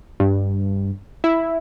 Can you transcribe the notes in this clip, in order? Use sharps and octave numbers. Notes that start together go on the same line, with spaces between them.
G2
E4